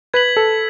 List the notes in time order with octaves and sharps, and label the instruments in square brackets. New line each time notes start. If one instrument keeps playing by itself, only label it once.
[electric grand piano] B4 [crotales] G#6 B6 F#7
[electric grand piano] A4